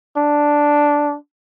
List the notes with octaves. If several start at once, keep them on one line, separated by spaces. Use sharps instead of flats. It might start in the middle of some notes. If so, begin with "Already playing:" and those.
D4